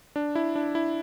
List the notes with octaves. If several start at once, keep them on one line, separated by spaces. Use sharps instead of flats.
D4
E4
D4
E4